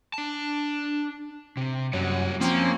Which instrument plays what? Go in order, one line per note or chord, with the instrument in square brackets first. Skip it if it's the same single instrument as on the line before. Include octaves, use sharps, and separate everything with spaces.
[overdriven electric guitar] D4 A5
C3
[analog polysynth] F#2 [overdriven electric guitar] G3 C#5
[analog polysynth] F3 C4 C#4 [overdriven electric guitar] A#3 A#5